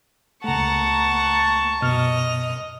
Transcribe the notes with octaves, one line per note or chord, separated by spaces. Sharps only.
C#2 A3 F#5 A5 A#5 C#6
F#2 B2 D#5 F6 F7